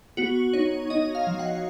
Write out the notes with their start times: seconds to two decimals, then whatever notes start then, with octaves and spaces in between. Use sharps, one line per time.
0.17 B3 F#4
0.53 D#4 C#5
0.90 D#4 D#5
1.15 F5
1.27 F3
1.39 F#5